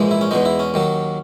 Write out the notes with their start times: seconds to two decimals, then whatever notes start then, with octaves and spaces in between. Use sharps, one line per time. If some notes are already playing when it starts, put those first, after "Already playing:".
Already playing: A#1 G#2 E3 G#3
0.11 E4
0.21 C#4
0.31 E2 B2 G#3 D#4
0.45 E4
0.59 C#4
0.74 D#2 D#3 F#3